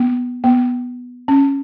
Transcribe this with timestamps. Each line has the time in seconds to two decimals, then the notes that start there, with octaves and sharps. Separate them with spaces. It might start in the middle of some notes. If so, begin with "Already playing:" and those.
Already playing: B3
0.44 B3
1.28 C#4